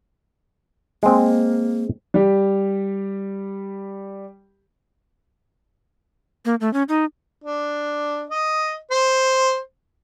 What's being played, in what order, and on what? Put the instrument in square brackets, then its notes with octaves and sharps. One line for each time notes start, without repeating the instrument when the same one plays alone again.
[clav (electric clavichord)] G#3 C4 [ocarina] A#3
[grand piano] G3 G4
[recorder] A#3
A3
C#4
D#4
[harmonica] D4
D#5
C5